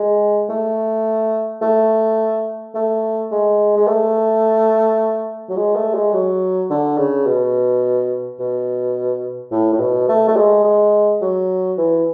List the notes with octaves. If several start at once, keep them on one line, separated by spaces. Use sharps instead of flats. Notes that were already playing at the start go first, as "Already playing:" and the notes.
Already playing: G#3
A3
A3
A3
G#3
G#3
A3
F#3
G#3
A3
G#3
F#3
D3
C#3
B2
B2
A2
A2
B2
A3
A3
G#3
G#3
F#3
E3